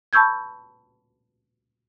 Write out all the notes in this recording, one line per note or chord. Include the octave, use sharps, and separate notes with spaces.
A5 B5 C#6 E6 G6 G#6